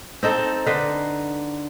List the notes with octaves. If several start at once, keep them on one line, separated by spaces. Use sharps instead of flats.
C4 D#4 A4
D3 D#4 B4